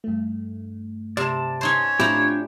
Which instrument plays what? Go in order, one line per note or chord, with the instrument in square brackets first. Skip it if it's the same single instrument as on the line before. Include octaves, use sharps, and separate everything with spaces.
[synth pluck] G2 A3
[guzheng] C3 [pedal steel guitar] D5 A5
[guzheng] C#4 D#4 C5 [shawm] C#5
[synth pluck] A2 C4 F4 [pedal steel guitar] D4 G4 [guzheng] E4 A#5